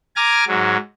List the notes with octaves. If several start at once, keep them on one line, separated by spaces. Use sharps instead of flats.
G#5 A#5 D6 F6 A6
G#2 F#3